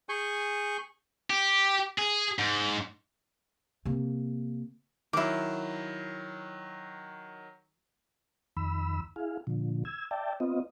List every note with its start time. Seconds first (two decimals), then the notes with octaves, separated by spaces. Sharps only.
0.09 G#4 G#5 C#6 G6
1.30 G4
1.98 G#4
2.39 G#2
3.85 C3 A#3
5.13 D#3 F#3 E4 D6
8.57 F2 D#3 B5 E6
9.16 E4 G#4 F5
9.47 A#2 D3 F3
9.85 E6 G#6
10.11 D5 E5 G5 A5
10.40 B3 C4 F4 D#5